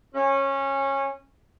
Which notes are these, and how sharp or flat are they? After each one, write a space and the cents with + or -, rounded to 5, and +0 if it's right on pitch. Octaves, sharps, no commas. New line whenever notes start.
C#4 -20